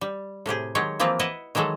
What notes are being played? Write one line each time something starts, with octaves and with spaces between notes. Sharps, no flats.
G3
A2 C3 G4 G#4
D#3 F#3 G#3 G4 C#5
E3 F3 A#3 C4 F4 B4
E4 B4 D#5 F#5
D#3 E3 F#3 G#3 A4